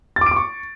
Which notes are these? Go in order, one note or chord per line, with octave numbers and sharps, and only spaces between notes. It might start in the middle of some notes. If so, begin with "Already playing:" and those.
A6
D6
D7
D6
C#6